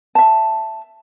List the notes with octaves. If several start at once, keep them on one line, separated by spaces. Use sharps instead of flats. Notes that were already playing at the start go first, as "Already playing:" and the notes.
E5 A5